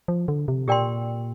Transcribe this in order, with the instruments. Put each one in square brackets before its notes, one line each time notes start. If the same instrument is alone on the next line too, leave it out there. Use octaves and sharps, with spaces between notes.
[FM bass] F3
D3
C3
[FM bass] A#2 [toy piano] G4 A#4 D5 G5 C6